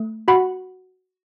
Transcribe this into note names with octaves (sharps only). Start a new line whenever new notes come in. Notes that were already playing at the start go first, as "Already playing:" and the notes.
Already playing: A3
F#4 F#5 B5